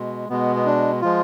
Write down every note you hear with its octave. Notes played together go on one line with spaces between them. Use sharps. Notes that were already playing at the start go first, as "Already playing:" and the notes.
Already playing: B2 G#3
B2 G#3 B3
B3
D4
F3 G#3 F4